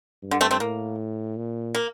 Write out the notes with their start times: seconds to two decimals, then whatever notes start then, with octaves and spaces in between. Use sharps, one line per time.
0.22 G2
0.31 D3
0.41 A3 C4
0.51 A3 C4
0.60 A2 A#3
1.37 A#2
1.75 A#3